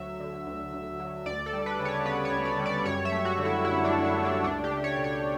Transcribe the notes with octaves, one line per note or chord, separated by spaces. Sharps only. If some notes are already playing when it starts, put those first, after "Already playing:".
Already playing: D2 F#3 E5
D3
D2
D2
F#3
D2 D5
A4
G3
B4
C#3
C#5
B3 B4
C#5
D2
D5
G3
D5
F#2 C#5
E5
A3
F#4
D3
E4
F#2 E4
D4
F#2
E4
A3
D4
C#2 D4
G4
A3
C#5
B2
C#5